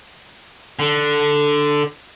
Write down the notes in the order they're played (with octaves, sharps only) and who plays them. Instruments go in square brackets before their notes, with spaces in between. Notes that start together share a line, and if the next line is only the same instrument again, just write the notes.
[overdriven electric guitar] D3